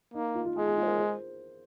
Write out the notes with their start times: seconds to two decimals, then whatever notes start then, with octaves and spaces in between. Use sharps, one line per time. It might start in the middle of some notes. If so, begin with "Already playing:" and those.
0.14 A#3 D#4
0.35 F4
0.45 F4
0.56 G#3 G#4
0.66 G#4
0.77 F4
0.83 C5
0.87 A#4
0.98 C5